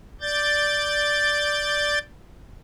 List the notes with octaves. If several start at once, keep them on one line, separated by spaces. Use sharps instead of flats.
D5 G6 A6